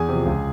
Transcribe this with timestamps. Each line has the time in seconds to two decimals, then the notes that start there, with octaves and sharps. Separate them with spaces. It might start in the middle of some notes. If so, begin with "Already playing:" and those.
Already playing: E2 G#4 G#5
0.08 C3 F3
0.26 C#2